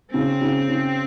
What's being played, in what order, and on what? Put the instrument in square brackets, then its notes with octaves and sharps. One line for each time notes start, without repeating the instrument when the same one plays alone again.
[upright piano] C#3 [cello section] C4
[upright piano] C#3
C#3